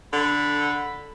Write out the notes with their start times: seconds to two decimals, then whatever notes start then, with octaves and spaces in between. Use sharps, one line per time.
0.13 D3 A4 B5